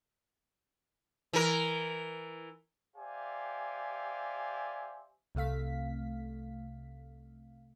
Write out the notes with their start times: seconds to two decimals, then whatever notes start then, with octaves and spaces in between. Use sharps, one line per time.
1.33 E3 A#4
2.97 G4 C5 D5 E5 F5 G#5
5.35 C2 C3 A3 F5 B6